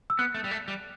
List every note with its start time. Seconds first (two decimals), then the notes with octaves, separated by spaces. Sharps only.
0.10 E6
0.19 B3 F#6
0.34 A3
0.44 G3
0.51 A3
0.68 G3